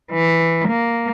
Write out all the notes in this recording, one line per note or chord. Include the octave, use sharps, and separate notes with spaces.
E3
A#3